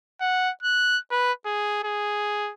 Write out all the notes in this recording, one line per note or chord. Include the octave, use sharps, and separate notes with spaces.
F#5
F#6
B4
G#4
G#4